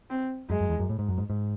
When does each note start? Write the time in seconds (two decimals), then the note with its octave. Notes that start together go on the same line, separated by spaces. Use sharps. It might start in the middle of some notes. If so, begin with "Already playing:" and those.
0.10 C4
0.50 F#2 G#3
0.60 F#2
0.69 E2
0.80 F#2
0.89 A2
0.99 G#2
1.09 F#2
1.18 G#2
1.30 G#2